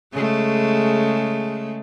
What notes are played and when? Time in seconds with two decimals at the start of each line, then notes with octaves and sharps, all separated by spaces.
0.13 C#3 G#3 A3